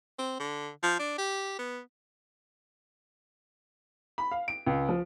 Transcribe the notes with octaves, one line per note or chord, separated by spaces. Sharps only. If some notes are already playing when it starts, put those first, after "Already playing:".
C4
D3
F3
D4
G4
B3
B5
F5
D7
C#2
F3